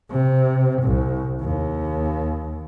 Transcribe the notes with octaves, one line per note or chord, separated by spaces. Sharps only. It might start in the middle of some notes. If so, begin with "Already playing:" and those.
C3
C2
D#2